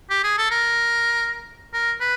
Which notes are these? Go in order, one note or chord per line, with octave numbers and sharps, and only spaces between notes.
G4
G#4
A4
A#4
A#4
B4